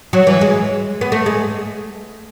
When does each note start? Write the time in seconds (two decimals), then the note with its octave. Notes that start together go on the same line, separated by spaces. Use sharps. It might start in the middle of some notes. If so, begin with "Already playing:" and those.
0.13 F#3
0.27 E3
0.41 G#3
1.01 B3
1.12 A3
1.26 G#3